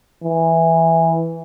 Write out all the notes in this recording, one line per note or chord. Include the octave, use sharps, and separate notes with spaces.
E3